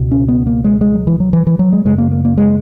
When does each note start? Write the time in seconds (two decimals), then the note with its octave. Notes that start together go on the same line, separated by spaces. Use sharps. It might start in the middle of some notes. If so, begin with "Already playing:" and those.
Already playing: C#2 B2
0.11 C#4
0.28 B3
0.46 A#3
0.64 G#3
0.81 G#3
0.94 F#3
1.07 E3
1.20 F#3
1.33 E3
1.47 E3
1.59 F#3
1.72 G#3
1.85 F#2 C#3 G#3
1.98 A#3
2.11 A#3
2.25 A#3
2.38 G#3